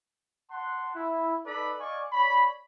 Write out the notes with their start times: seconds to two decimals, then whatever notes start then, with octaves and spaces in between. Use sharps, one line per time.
0.50 F#5 A5 C6
0.95 E4
1.46 D#4 A4 B4 D5 B5
1.80 D5 D#5 F5 G#5 C#6
2.12 C#5 D5 B5